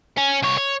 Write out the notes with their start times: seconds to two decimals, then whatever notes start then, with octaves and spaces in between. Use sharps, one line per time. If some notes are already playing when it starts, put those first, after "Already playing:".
0.18 C#4
0.43 C2 C#5
0.58 C#5